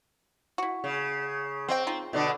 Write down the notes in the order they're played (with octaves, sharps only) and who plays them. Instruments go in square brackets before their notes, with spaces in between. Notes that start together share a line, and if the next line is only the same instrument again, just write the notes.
[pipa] E4 F#4
[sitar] C#3
[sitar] C4 [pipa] C5 D#5 G5
[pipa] D#4 F4
[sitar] B2 D3 D4